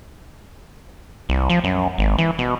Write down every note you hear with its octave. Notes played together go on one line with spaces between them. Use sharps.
C2
F3
F#2
G#1
E3
B2